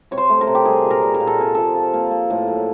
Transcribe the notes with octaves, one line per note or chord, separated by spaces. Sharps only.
C3 C#5
C5
A3
A#4
C3
G4
G3 G#4
A#2
A#4
G3
A#4
A#2
A4
C3 G#4
F3 A4
F3
A#3
A#3
A2
F#3